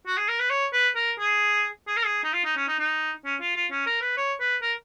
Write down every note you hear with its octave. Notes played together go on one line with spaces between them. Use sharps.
F#4
G#4
A#4
B4
C#5
B4
A#4
G#4
G#4
A#4
G#4
D#4
F4
D#4
C#4
D#4
D#4
C#4
F4
F4
C#4
A#4
B4
C#5
B4
A#4